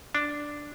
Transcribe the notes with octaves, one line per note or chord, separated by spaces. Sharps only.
D4